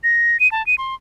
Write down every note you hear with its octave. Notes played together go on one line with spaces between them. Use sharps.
A#6
D#7
A5
D#7
C6